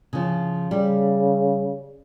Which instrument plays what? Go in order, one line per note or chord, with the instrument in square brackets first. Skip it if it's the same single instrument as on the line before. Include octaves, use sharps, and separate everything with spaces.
[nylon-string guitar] C#3 F3
[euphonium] C#3 [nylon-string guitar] G3